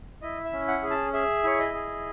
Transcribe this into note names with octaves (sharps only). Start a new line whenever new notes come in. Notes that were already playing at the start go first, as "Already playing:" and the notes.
E4 D#5
E5
C#4
F#5
G#4
A5
G#4 E5
E4 C#5
D#5
G#4